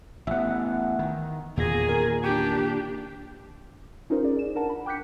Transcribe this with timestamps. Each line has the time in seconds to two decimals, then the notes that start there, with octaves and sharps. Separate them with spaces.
0.27 A1 B3 E5 F#5
0.99 D#3
1.57 E2 A#2 D#3 G#4 G#5 A#6
1.89 A#4
2.24 D4 G4
4.10 C#4 D#4 F4 A#4 C5
4.23 G#4 A#4 D5
4.39 E7
4.55 D4 A#4 F#5 A5
4.69 B5
4.86 G5 D6 F#6 G6 B6 C#7